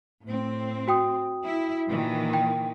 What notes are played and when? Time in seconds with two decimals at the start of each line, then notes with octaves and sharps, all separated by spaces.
0.24 A2 C4
0.88 F#4 G5 D#6
1.46 E4
1.89 A#2 D#3 E3
2.33 G5